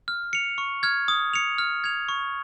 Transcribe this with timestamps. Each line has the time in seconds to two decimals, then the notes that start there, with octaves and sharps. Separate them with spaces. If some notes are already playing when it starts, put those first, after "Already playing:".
0.08 F6
0.33 C#7 F7
0.58 C#6
0.83 F6 G#6
1.08 D#6
1.33 C#7 F7
1.58 F6
1.84 G#6 F7
2.09 C#6